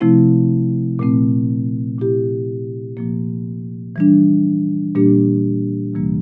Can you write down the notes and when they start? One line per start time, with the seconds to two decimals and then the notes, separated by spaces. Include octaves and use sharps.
0.01 C3 F3 A3 C4 E4
0.99 A#2 A3 C4
1.99 A#2 A3 E4 G4
2.97 A#2 F3 A#3
3.96 E3 G3 D4
4.95 A#2 G3 A#3 D4 G4
5.93 D2 C3 E3 G3 A#3